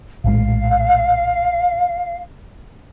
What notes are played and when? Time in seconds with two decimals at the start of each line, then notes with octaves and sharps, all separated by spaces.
0.24 A#1 A2 G#3 F5